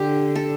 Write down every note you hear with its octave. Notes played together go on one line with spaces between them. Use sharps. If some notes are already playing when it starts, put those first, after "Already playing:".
Already playing: D3 G4
A4